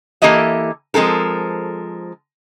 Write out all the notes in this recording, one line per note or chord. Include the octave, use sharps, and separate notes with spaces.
E3 A#3 G4 A4 D#5 E5
F3 G#3 C4 A4 A#4